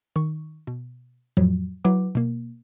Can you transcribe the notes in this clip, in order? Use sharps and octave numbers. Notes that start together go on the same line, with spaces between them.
D#3 C#6
B2
F2 A2 F3 F#3
F#3 E4 B4 F#5 D6
B2 A#3